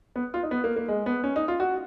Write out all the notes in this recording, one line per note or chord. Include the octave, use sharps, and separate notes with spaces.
B3
F4
D#4
B3
A#3
A#3
G#3
B3
C#4
D#4
F4
F#4